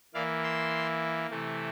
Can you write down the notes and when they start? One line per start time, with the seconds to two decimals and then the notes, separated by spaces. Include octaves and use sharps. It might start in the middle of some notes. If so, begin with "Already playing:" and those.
0.14 E3 A#3 E4 D5 F5
0.43 C6 E6
1.30 C3 E3 A3 E4